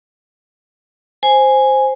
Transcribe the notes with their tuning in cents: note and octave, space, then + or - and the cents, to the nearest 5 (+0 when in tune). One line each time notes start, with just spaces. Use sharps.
C5 +0 G#5 +0